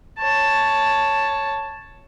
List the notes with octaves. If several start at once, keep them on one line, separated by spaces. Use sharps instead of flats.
C#5 A5